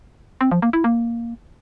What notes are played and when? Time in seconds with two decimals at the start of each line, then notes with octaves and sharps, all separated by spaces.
0.41 C4
0.51 F3
0.62 A#3
0.73 E4
0.84 A#3